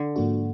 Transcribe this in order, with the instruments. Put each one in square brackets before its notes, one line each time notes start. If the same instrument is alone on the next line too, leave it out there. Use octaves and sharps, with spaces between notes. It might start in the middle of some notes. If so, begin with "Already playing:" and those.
Already playing: [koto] D3
[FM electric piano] G#2 F3 A#3 D4 F#4